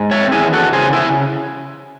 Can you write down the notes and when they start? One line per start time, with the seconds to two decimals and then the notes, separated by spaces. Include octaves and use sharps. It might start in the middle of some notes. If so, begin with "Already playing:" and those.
Already playing: G#2
0.11 C#5 E5
0.18 C4
0.32 E4 G#4
0.46 E3
0.53 F#4 A4
0.72 C#3 G#4 C5
0.93 E4 G#4
1.00 C#3